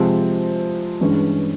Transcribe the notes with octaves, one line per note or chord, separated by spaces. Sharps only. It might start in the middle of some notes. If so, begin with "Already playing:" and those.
Already playing: C3 F3 G#3 C4
G2 E3 G#3 C#4